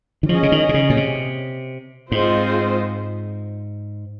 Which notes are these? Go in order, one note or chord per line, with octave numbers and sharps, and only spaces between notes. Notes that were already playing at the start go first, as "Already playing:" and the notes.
D#3
F3 C#4 G#4 D#5
C#3
D#3
C3
C#3
A#2
C3
G#2 G#3 C4 F4 C5 D#5